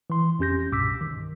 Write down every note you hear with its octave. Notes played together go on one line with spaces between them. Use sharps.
E3 C6
F2 C#4 G4 G6 A#6
C2 G2 B2 D6 E6 B6
D#3